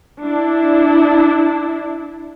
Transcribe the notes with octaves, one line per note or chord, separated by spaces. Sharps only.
D4 E4